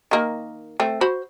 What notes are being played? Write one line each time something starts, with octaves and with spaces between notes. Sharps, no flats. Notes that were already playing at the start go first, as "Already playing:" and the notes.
D#3 A#3
A3 C4
F#4 C5 B5